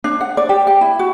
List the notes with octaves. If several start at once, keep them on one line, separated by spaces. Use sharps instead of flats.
D4
F#5
D5
G4
G5
E4
F#4